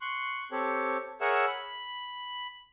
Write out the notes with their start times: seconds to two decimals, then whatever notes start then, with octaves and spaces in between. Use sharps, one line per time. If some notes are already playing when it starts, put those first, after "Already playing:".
0.01 C6 C#6 F#6
0.51 C4 G4 A4 C#5
1.21 G#4 A#4 C#5 E5 F#5 E6
1.48 B5